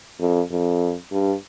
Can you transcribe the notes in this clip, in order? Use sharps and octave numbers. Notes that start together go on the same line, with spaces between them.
F2
F2
G2